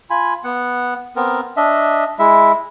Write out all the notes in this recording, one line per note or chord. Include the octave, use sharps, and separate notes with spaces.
F4 G#5 B5
B3 F#5
B3 C4 A#4
D4 D#5 E5
G#3 E4 E5